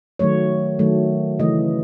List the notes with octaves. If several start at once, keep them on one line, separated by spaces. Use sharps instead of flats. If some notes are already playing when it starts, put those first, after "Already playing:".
D#3 F#3 A3 C#5
D#3 F#3 A3
C#3 E3 A3 D#5